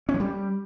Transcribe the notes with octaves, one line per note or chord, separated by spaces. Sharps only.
C#4
F3
G3